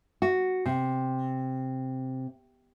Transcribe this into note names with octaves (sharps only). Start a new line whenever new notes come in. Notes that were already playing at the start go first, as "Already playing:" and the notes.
F#4
C3